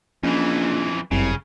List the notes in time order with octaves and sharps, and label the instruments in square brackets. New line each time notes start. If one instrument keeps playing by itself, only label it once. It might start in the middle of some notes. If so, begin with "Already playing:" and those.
[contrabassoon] A#1 [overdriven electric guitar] F2 E3 [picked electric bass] C#4
[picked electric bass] G1 F#2 [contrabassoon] C2 [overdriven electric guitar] C#3